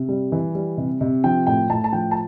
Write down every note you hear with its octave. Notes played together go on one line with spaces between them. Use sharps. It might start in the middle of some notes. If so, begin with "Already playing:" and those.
Already playing: C3
G3
E3
G3
C3
C3
F3 G5
A2 G5
A2 A5
A5
F3 G5
A5